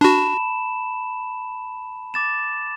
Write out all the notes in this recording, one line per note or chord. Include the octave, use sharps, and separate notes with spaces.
D4 F#4 A5 B5 E7
D6 A6 E7